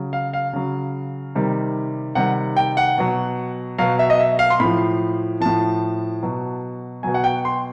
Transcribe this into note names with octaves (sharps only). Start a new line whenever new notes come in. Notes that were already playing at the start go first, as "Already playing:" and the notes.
Already playing: C#3 F#3
F5
F5
C#3 F#3
C3 D#3 G3
C3 D#3 G3 F#5
G5
F#5
B2 F#3
B2 F#3 F5
E5
D#5
E5
F5
C6
A2 F3 B5
A2 F3 A5
B2 F#3
B2 F#3 G#5
F#5
G5
C6